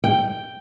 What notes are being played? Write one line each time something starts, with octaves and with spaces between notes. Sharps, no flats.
G5